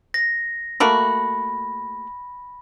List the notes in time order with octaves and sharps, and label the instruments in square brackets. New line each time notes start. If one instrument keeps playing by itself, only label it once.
[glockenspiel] A#6
[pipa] A3 A#3 F#4 [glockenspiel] B5